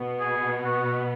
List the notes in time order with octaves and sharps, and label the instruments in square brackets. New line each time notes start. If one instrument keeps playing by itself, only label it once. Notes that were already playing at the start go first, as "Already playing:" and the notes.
Already playing: [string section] B2 B3
[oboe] G#4
F#4